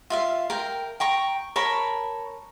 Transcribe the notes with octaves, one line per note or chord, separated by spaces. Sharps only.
F4 E5 F5
A#4 G5
G5 A#5 C#6
A#4 C#5 A5 B5